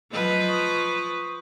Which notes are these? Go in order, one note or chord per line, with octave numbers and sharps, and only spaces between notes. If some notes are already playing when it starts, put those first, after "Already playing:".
F3 F#3 B4 C5 D#5
C#6 D#6